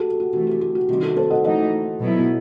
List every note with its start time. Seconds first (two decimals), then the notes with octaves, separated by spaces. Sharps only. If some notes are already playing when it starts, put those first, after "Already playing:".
Already playing: F#4 G4 A4
0.20 F#4
0.33 C3 E3 A3 F#4
0.47 G4
0.61 G4
0.75 F#4
0.88 C3 D#3 G3 F#4
1.02 F#4 A4
1.17 A4 C5
1.30 D#5 F#5
1.44 E3 A3 D#4 D#5 F#5
2.00 B2 F#3 B3 E4